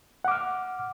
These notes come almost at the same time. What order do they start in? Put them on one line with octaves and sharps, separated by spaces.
F#5 D6 F6